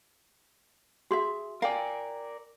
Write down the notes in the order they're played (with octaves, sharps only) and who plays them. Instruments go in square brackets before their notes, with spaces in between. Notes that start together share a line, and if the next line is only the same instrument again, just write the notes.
[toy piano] F#4 C6 [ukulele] G#4 E5
[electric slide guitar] A#4 D5 [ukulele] F5 G5 G#5